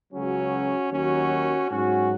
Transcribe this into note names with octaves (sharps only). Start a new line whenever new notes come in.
C#2 C#3 F#3 C#4 F#4
D#2 D#3 F#3 C#4 F#4
G#2 F#3 C#4 F#4